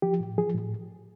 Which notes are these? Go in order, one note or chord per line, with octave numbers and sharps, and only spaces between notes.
F3 G4
A2
F3 G#4
A2